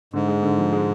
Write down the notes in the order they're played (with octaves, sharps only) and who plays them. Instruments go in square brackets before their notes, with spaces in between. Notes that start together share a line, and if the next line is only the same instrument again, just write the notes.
[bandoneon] G#2 [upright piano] D3
[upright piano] G#3
D3
F3
G#3